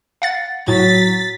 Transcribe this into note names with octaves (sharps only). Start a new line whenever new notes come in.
F5 F#5 A6
A2 F#3 A6 B6